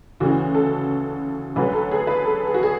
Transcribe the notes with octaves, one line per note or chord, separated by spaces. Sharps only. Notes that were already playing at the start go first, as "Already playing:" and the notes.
D2 C#3 E3 F#4
A4
D2 D3 F#3 B4
A4
G#4
B4
A4
G#4
F#4
G#4